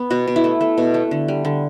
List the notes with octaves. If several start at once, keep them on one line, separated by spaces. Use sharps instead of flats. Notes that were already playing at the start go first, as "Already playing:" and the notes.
Already playing: B3
B2 F#4
B2
E4
A3
A3
B2
A3
D3
G3
D3